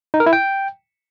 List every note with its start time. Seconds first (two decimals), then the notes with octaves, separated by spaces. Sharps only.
0.14 D#4
0.20 A#4
0.26 E4
0.33 G5